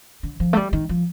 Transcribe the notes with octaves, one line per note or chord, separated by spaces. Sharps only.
D3
F3
A3
G3
D#3
F3